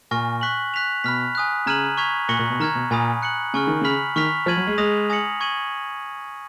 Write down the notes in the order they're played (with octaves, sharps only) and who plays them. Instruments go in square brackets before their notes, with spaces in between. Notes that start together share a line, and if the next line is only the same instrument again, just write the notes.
[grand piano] A#2 [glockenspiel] G#5 C#6 F6 A#6
[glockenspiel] C#6 F#6 B6 F#7
F#6 B6 F7
[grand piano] B2 [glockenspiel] B5 F6 B6
[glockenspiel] G#5 D#6 F#6
[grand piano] C#3 [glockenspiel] A#5 F6 G#6 D#7 F#7
[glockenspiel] C#6 F6 G#6 B6 F7
[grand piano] A#2 [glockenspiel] C#6 F#6 A#6 C#7 F#7
[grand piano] A#2
B2
[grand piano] D#3 [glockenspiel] A#5 F6 G#6
[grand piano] B2
[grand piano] A#2 [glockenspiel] G#5 B5 D#6
[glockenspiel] F#6 C#7 F#7
[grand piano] C#3 [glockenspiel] G#5 C#6 F6
[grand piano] D#3
[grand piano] C#3 [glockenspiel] B5 F6 B6 F#7
[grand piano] D#3 [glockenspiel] C#6 F6 B6 F7
[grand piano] F3 [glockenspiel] F6 G#6 D#7 F#7
[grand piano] F#3
G#3
[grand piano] G#3 [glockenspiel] D#6 A#6 F7
[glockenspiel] G#5 D#6 A#6 C#7 F#7
C#6 G#6 D#7 F#7